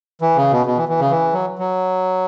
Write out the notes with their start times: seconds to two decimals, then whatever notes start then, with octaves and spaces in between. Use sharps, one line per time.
0.21 E3
0.36 C#3
0.51 B2
0.66 B2
0.77 E3
0.89 E3
1.00 C#3
1.11 E3
1.33 F#3
1.59 F#3